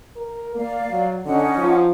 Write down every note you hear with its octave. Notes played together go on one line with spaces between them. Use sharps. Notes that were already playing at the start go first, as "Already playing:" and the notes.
A#4
A#3 D5 F5
F#3
D3 C#4 D#4 F#5
F3